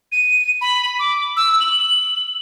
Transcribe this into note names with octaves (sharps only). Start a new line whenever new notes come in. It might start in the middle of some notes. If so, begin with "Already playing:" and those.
D#7
B5
D6
E6
F#7